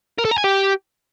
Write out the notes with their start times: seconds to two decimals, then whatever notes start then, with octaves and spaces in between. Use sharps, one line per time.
0.18 A#4
0.25 A4
0.31 A#5
0.38 G#5
0.44 G4